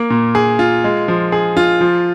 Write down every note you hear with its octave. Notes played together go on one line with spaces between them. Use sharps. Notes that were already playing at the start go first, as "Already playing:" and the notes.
Already playing: A#3
A#2
G#4
F4
G#3
F3
G#4
F4
F3